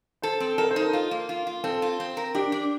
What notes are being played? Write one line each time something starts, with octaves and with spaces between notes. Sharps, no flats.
A4 C5
C4
A4 A#4
C5
D#4
A#4
F4
A#3
F4
F4
C4 A4
F4
C4
A#4
D4 G4
D4